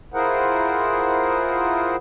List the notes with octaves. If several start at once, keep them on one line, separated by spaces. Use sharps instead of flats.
E4 F4 G#4 A#4 C5 F#5